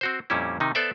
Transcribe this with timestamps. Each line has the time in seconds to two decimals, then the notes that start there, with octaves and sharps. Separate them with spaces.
0.01 C4 F#4 C5
0.30 F2 A#2 G3 C#4 E4
0.60 C3 D#3 D#4
0.75 B3 A4 C5 D5 E5